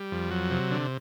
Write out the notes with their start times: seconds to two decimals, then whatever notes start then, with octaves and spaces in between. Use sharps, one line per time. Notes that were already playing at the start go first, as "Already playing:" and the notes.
Already playing: G3
0.12 F2
0.31 F#3
0.50 C3
0.71 D3